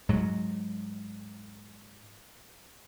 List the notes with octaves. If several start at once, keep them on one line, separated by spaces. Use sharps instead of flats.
G#2 F#3